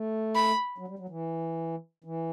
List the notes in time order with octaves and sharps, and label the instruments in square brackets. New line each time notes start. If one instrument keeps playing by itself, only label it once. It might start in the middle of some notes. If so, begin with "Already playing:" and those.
Already playing: [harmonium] A3
[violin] B5
[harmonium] F#3
G3
F#3
E3
E3